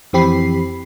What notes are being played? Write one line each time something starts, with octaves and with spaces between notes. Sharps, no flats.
F2 E3 C4 G4 B5 C7